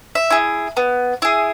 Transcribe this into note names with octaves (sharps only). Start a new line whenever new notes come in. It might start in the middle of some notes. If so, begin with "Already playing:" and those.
E5
E4 G#4
B3
E4 G#4